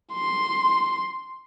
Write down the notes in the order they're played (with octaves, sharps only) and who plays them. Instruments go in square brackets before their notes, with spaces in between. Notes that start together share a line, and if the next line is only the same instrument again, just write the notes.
[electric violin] C6